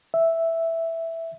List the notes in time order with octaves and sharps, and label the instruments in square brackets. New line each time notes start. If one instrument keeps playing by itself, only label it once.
[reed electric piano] E5